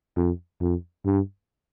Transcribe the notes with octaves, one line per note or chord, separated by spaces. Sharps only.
F2
F2
G2